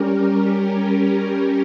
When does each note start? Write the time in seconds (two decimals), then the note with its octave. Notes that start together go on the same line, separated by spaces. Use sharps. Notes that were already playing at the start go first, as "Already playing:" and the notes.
Already playing: G3 C#4 G4 A#4